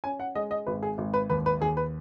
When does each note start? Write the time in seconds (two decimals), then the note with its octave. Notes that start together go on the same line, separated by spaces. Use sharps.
0.04 C#4 G#5
0.20 F#5
0.35 G#3 D#5
0.51 D#5
0.66 G#1 B4
0.83 G#4
0.98 G#1
1.14 B4
1.30 D#2 B4
1.46 B4
1.61 D#2 G#4
1.77 B4